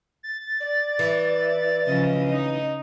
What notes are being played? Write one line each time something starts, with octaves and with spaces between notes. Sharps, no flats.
A6
D5
E3
C#3 F3 D#5
D#4